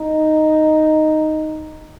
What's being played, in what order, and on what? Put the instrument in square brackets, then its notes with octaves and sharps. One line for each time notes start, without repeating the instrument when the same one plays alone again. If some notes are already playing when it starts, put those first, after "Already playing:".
Already playing: [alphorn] D#4